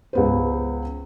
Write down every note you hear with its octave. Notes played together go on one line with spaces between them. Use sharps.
C#2 B3 C5